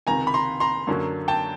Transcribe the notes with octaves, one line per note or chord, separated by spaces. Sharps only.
C#2 C3 D#3 G#5 A#5
B5
A#5 C6
A#5 C6
F#2 D3 F#3 A#3 C#4
G5 A5